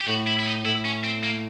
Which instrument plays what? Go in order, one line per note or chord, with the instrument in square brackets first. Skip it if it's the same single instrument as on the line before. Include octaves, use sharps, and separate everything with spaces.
[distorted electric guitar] G4
[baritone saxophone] A2 [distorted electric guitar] F#4
[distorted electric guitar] E4
E4
D#4
[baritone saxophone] A2 [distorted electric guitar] E4
[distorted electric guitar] C#4
C4
A#3